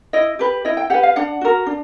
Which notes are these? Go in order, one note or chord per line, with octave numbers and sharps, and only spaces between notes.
E4 D#5
G4 B4
E4 D#5
G5
G4 B4 F#5
F5
D4 F#5
F#4 A#4
D4